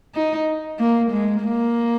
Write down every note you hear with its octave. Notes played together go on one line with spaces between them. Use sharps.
D#4
A#3
G#3
A#3